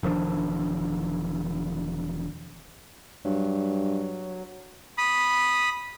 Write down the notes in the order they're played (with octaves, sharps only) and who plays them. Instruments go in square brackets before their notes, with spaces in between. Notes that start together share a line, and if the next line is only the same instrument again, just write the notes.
[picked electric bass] E1 D#3 F3 D4
[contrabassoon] G2 [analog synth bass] F#3
[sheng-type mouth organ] B5 D#6